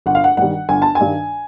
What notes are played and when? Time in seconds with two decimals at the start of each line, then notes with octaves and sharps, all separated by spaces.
0.06 G1 F#5
0.15 F5
0.24 F#5
0.37 G2 D#3 G3 F#5
0.69 G1 G#5
0.82 A5
0.95 G#5
1.00 G2 D#3 G3